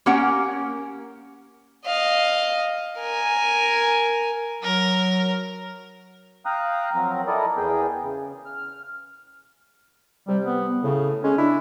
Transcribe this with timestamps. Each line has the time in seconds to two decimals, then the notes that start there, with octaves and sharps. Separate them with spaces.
0.06 A#3 C#4 G4 A#4 F#5
1.86 D#5 F5
2.99 A#4 G#5
4.63 F#3 A#4
6.46 F5 G5 A#5 D#6 F#6
6.95 F3 F#3 C4 A#4
7.27 E4 A4 A#4 D5 D#5
7.57 E2 B3 G#4 G5
8.03 C#3
8.45 F6
10.28 C3 G3
10.44 B3
10.83 A2 C#3
11.24 G#3 C#4
11.38 D4 E4